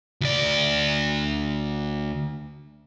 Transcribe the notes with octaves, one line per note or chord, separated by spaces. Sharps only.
D2 D5